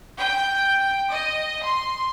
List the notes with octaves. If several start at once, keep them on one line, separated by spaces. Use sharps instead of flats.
G5
D#5
C6